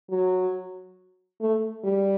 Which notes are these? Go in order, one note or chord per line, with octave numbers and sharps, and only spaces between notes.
F#3
A3
G3